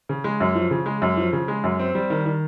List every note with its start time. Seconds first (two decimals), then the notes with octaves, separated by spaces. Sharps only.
0.09 C#3
0.24 G#3
0.40 F#2
0.55 F3
0.71 C#3
0.86 G#3
1.02 F#2
1.17 F3
1.33 C#3
1.48 G#3
1.64 F#2
1.79 C4
1.95 G3
2.10 D#3
2.26 D#3